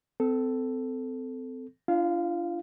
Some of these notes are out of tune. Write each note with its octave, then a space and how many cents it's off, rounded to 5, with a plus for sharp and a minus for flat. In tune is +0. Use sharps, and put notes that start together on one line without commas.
C4 -30 A4 +0
D4 +0 F4 -35 F5 +0